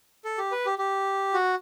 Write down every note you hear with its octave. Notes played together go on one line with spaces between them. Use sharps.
A4
G4
B4
G4
G4
F#4